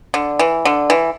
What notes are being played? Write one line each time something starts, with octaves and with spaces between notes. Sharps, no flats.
D3
E3
D3
E3